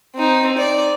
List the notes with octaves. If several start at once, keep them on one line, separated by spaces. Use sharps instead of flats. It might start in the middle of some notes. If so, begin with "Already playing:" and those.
C4 D#4
D5